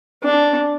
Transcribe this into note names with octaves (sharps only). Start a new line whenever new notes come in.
D4